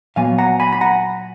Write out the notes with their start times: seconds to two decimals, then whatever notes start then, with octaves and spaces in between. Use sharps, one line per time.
0.16 A#2 F#3 B3 F5 G#5
0.38 F#5 A#5
0.60 G#5 B5
0.72 B5
0.81 F#5 A#5